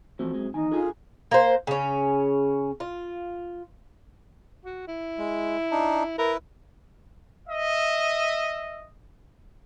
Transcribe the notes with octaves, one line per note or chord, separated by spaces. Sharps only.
E3 F3 A3 C4 F#4 C5
F#2 G#3
E2 D#3 D#4 G#5
D4 F4 G#4 A4 G#5 D#6
A#3 C5
C#3 C#4
F4
F#4
E4
G#3
D4 D#4
E4 A#4 B4
D#5 E5